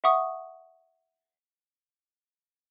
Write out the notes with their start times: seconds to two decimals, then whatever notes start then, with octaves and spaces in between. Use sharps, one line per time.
0.04 E5 F#5 C#6 D#6